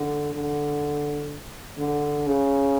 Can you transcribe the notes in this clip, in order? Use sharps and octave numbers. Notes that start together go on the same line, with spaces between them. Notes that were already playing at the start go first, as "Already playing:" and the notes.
Already playing: D3
D3
D3
C#3